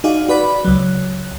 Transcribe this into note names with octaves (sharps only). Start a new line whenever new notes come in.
D#4 F#4 G#4 D5 F5
F#4 B4 D5 B5
C#2 F#3